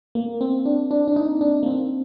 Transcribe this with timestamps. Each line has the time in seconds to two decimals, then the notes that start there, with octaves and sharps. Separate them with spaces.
0.15 A#3
0.41 C4
0.66 D4
0.91 D4
1.08 D4
1.16 D#4
1.41 D4
1.63 A#3
1.66 C4